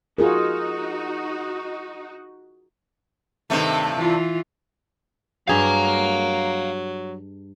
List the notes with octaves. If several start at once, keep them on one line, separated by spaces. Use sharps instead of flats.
D#4 F4 F#4 G#4 A#4
G2 C3 D#3 A3
E3 F4
G2 F#3 G#4 F5 G5 A#5